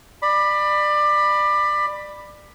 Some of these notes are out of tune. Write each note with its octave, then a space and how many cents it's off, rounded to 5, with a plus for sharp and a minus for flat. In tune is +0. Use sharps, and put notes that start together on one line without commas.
D5 +25 B5 +0